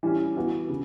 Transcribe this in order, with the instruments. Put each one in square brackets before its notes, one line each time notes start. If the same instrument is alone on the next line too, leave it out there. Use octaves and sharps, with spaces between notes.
[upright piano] E3 G3 C#4
E3 B3 F#4
C#3